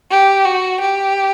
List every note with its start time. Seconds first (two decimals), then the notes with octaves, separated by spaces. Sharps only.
0.11 G4
0.46 F#4
0.81 G4